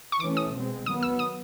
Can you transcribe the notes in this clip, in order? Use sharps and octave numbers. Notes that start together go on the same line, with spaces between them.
C#6
E3 A3 C#4 D6
D#6
B2 G#3 C4
D#3 F#3 B3 D#6
E6
D#6